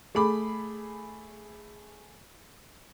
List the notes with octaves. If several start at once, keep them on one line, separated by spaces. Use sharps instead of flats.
A3 G#4 B5 D6